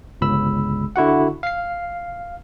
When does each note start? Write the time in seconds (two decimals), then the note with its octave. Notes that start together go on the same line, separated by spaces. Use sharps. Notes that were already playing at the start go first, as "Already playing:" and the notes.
0.21 G1 C#2 B5 E6
0.96 D3 E4 F#4 F#5
1.43 F5 C7